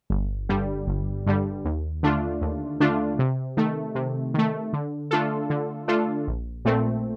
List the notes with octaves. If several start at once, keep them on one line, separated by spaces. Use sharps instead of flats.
G1
G2 D3 G3
G1
G2 D3 G3
D#2
D3 A3 D4 F4
D#2
D3 A3 D4 F4
C3
D#3 A3
C3
D#3 A3
D3
A3 D4 F4 A4
D3
A3 D4 F4 A4
A#1
A#2 A3 C4